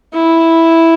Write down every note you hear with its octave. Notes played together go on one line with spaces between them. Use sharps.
E4